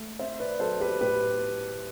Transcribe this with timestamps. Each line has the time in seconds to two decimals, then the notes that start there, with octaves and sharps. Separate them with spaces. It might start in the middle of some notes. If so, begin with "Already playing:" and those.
Already playing: A3
0.19 C4 C5 E5
0.40 B4 D5
0.60 F#3 A4 C5
0.80 G4 B4
1.01 A2 G4 B4